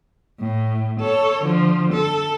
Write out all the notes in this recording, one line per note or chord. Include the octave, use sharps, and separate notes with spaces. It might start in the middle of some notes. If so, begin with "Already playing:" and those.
A2
A4 C#5
D3 F3
A4